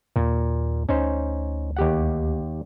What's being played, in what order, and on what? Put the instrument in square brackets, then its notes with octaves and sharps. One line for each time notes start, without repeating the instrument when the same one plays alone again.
[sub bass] D#2 [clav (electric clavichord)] A#2
[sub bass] D2 [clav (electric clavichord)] C#4 D#4 C5
[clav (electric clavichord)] D#2 G4 F#5